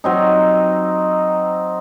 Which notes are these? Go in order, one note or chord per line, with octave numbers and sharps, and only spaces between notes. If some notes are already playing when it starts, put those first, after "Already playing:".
F#3 C4 D#4